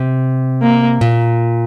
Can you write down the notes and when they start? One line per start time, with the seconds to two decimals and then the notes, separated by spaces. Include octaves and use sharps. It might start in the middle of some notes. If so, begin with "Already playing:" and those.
Already playing: C3
0.62 A#3
1.01 A#2